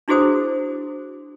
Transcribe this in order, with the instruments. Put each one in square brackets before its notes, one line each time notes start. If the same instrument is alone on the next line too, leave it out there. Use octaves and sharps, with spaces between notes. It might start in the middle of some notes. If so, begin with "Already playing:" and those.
[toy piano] D4 E4 F#4 G#4 C5 D#6